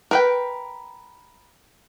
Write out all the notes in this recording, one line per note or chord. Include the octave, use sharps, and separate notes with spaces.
A#4 B4 G5